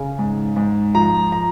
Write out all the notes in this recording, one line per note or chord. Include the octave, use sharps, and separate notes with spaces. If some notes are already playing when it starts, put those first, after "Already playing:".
Already playing: C#3
G#2
G#2
F3 A#5
A#5